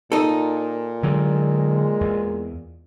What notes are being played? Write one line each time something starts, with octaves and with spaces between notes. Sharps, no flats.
A#2 D#4 A4
D3 F#3 G#3 A#3
E2